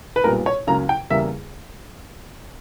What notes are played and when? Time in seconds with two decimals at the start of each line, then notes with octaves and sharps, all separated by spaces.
0.16 B4
0.24 B1 A#2 G3 B3 A#4
0.46 C#5
0.67 C#2 C#3 F#3 A#3 A#5
0.89 G5
1.10 E2 C#3 G3 A#3 E5